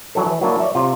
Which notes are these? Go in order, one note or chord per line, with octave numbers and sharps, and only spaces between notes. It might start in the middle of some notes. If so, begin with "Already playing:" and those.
E3 F#3 D4 A4
E3
F#3 A#3 D4 E4
C#5 D5 E5
C3 F4